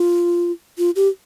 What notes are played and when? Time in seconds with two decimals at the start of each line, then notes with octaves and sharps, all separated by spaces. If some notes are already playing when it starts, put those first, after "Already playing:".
Already playing: F4
0.78 F4
0.96 G4